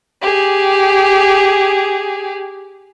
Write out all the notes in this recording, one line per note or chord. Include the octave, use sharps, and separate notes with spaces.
G4 G#4